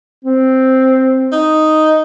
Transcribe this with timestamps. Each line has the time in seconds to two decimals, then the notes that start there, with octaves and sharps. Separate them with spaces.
0.25 C4
1.32 D#4